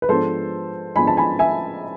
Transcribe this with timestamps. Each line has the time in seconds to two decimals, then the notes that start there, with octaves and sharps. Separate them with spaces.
0.02 B4
0.09 G#2 F3 B3 D4 A4 C5
0.96 G#2 F3 B3 D4 G#5 B5
1.07 A5
1.17 G#5 B5
1.39 E5 G#5